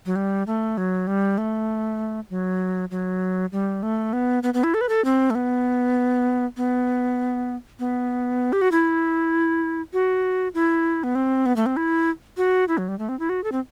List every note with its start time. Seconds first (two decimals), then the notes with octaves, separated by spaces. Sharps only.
0.06 F#3
0.16 G3
0.47 A3
0.78 F#3
1.07 G3
1.38 A3
2.30 F#3
2.91 F#3
3.52 G3
3.83 A3
4.13 B3
4.43 B3
4.54 B3
4.64 E4
4.74 A4
4.81 B4
4.89 A4
5.05 C4
5.30 A3
5.35 B3
6.57 B3
7.79 B3
8.53 G4
8.61 F#4
8.72 E4
9.93 F#4
10.54 E4
11.04 B3
11.15 C4
11.46 B3
11.56 A3
11.66 C4
11.77 E4
12.37 F#4
12.68 E4
12.78 F#3
12.88 G3
12.99 A3
13.09 C4
13.19 E4
13.29 F#4
13.44 A4
13.52 C4